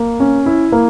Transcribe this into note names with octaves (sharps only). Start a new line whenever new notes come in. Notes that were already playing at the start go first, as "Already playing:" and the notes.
Already playing: A#3
C#4
E4
A#3